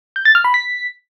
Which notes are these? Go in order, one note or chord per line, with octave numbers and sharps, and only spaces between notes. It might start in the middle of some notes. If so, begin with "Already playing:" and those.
G6
A6
F6
B5
B6